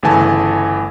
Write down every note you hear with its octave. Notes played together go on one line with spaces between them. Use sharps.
G1 C#3 E3 A3 G#5 A5